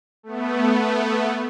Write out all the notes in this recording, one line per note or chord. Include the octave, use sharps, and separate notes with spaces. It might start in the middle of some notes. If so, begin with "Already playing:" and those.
A3 B3